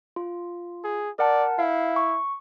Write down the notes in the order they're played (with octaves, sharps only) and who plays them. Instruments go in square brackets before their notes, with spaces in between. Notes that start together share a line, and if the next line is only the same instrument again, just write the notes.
[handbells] F4
[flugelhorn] G#4
[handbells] A#4 F#5 A5 [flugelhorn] D5
[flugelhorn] E4 [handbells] F5
[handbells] C#6